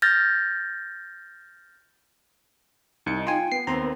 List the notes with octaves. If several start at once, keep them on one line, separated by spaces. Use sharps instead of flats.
F6 G6 A6 A#6
C2 D#4 C#7
F4 G5 G#5 C6
B3 C7
D#2 C4 A#5 C6